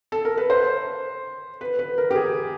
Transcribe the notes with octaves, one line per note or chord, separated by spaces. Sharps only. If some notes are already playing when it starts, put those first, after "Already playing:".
A4
A#4
B4
C5
B4
B4
A#4
G4
G#4